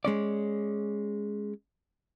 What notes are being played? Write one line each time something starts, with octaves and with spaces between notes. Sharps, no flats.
G#3 C#4 D5